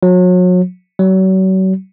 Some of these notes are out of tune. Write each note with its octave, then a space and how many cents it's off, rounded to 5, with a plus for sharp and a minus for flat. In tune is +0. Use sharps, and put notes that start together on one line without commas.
F#3 -35
F#3 +35